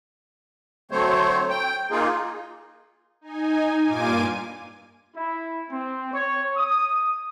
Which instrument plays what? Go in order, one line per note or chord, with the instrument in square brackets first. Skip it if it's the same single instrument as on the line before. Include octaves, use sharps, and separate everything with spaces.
[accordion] D3 F#3 A3 C4 C5 C#5
G5
A#3 D#4 F4 G#4
[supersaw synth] D#4 G#5
G2 A#2 F4 G#5 D6 D#7
[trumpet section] E4
C4
C#5
D#6